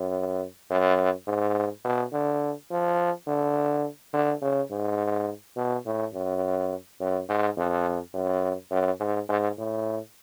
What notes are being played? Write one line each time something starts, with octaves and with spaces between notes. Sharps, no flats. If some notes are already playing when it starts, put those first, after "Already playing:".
Already playing: F#2
F#2
G#2
B2
D3
F3
D3
D3
C#3
G#2
B2
A2
F#2
F#2
G#2
F2
F#2
F#2
G#2
G#2
A2